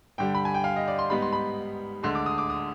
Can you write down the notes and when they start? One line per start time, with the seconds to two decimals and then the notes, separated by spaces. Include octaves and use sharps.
0.18 G2 D3 G3 G5
0.35 B5
0.45 G#5
0.54 G5
0.64 F5
0.76 D#5
0.88 D5
0.99 C6
1.10 G#2 G3 B3 D#4 B5
1.22 C6
1.33 B5
2.03 D2 D3 G#3 C6
2.15 D6
2.26 D#6
2.38 D6
2.50 D#6